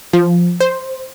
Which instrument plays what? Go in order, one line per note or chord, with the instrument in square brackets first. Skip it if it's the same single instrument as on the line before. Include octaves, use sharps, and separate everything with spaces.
[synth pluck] F3
C5